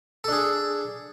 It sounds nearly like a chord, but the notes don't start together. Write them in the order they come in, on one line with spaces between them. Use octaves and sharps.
A4 D4 G#4